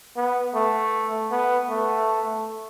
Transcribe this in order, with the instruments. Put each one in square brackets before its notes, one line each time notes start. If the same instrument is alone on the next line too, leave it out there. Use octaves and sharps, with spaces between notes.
[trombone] B3
A3
B3
A3